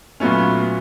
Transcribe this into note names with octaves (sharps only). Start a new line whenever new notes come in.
A#2 F#3 A3 B3 C#4